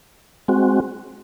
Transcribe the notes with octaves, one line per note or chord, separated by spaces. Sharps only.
G#3 C4 F#4